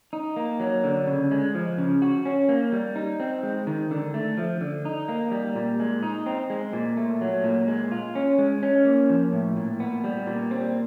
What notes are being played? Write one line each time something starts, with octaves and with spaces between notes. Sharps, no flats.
D#4
A#3
F#3
D3
C#3
G#3
F3
C#3
F#4
C#4
A#3
G3
D#4
C4
G#3
D#3
D3
A3
F3
D3
D#4
A#3
G3
A#2
G#3
D#4
C4
G#3
A#2
A3
F#3
A#2
G#3
F4
C#4
G#3
C#4
A#3
F3
A2
A#2
B3
G3
A#2
C4